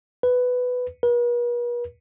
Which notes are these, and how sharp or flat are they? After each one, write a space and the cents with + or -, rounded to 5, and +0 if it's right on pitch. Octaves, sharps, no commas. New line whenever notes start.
B4 +10
B4 -45